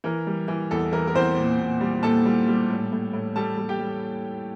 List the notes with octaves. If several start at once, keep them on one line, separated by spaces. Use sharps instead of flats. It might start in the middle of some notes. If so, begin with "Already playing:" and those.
E3 A#4
G3
E3
E2 A4
E3 A#4
A#4
E2 C4 C5
A#2
A#2
G3
A#2 A4 A5
G3
G3
A2
A2
A2
G3 A4 A5
G3
G4 G5
G3